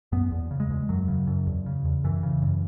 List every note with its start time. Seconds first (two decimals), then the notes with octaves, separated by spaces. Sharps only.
0.12 F#2 B3
0.32 E2
0.51 C#3
0.60 G#3
0.70 E2
0.89 F#2 F#3
1.08 C#3
1.27 F#2
1.47 E2
1.66 C#3
1.85 E2
2.04 F#2 E3
2.23 C#3
2.42 F#2